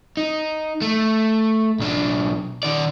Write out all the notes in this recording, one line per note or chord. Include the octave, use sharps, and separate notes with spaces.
D#4
A3
B1 D4
D#3 D5